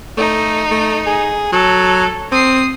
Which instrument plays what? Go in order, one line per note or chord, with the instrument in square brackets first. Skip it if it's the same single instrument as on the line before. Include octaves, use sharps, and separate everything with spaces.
[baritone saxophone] A3 [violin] D#4
[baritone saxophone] A3
G#4
[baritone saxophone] F#3 [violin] A4
[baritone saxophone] C4 [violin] D#6 C7